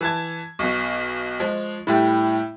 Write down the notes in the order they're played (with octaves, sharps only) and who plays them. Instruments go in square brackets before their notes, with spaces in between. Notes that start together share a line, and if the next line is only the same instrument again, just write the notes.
[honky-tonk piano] E3 A5 G#6
[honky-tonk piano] B1 B2 [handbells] C#6
[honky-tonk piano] F3 G#3
[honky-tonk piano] A2 G3 [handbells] E4 G5